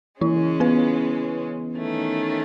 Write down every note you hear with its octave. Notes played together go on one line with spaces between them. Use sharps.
C#3 E3 G#3 C#4 E4
B3 B4
D#3 A3 C#4